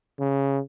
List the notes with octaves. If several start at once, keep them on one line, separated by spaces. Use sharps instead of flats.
C#3